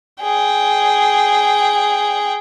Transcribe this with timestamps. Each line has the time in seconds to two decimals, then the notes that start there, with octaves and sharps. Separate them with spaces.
0.22 G#4 G5